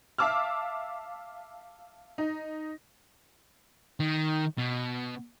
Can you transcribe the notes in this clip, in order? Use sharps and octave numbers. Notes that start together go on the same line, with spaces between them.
E5 F5 A5 D6 E6 F6
D#4
D#3
B2